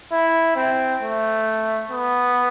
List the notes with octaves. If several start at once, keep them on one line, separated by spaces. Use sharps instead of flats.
E4
C4
A3
B3